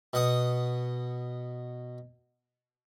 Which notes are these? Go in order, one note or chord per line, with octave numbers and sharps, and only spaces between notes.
B2 F#5 D#6